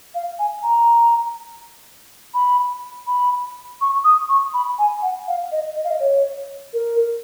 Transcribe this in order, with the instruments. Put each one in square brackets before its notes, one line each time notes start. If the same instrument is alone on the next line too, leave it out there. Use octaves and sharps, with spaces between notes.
[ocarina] F5
G#5
A#5
B5
B5
C#6
D#6
C#6
B5
G#5
F#5
F5
D#5
D#5
F5
D#5
C#5
A#4